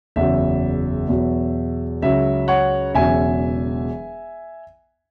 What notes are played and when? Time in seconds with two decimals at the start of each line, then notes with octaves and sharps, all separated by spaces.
0.16 F#1 E2 C#3 F#3 E5
1.09 E2 B2 F#3
2.02 C#2 C#3 F#3 E5
2.48 C#5 F#5
2.94 E1 E2 C#3 F#3 E5 G#5